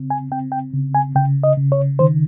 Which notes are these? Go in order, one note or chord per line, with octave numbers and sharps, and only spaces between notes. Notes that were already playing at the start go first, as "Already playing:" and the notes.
Already playing: C#3 C4
G#5
C4 G5
G5
C#3
G#5
C#3 G5
D#5
C#3
C#5
D#3 C5